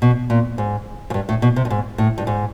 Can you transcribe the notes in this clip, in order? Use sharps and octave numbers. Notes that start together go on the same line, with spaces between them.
B2
A#2
G#2
G#2
G2
A2
B2
C3
G2
G#2
A2
G2
G#2